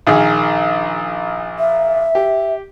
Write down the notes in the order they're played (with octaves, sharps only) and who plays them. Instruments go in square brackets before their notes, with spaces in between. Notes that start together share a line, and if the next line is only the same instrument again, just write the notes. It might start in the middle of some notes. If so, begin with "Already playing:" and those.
[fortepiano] A#1 D#3 G#4
[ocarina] E5
[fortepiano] G4